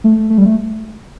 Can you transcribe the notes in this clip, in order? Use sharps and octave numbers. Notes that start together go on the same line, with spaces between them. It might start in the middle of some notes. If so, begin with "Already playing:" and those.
A3
A3
G3
A3